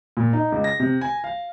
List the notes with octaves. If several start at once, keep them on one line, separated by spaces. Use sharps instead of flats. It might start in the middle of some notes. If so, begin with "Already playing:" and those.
A#2
D#4
C#2
A#6
C3
G#5
F5